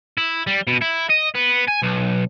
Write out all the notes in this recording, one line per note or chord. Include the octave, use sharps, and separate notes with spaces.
E4
G3
B2
E4
D#5
B3
G#5
B1